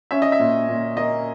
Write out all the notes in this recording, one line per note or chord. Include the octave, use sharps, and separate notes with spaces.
C#4 E5
D#5
E5
A#2
A#2
A#3 D#5